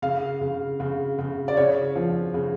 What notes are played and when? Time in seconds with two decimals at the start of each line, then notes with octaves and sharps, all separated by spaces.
0.02 C#3 F5
0.41 C#3
0.80 C#3
1.19 C#3
1.48 D5
1.57 C#3 C#5
1.96 F3
2.34 C#3